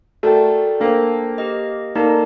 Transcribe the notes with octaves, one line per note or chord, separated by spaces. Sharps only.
A3 F#4 A#4 D5 G5
A#3 D4 A4 C5 G5
G4 A#4 D#5
A#3 D#4 A4 D5 A5